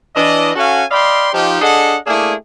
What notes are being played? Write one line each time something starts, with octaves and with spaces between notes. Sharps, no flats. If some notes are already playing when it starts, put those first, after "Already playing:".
E3 D4 D#5
C#4 F#4 A4 F5 F#5 G#5
D5 D#5 F5 G5 B5 C6
F3 D#4 G4
D4 G#4 A4 D#5 F#5
A3 A#3 D4 E4 G#4